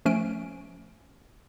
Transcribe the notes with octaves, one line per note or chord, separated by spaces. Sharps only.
F3 A3 C#4 G#5 D7